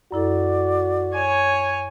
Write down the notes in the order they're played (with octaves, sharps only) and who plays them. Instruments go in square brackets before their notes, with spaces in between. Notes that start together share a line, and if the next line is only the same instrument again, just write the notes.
[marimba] F#2 E4 A4 [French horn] F#4 [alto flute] D5
[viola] C#5 G#5